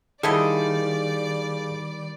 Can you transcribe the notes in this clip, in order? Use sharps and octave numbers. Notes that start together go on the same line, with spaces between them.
D3 D#3 G3 E4 G#4 D5 D#5 F5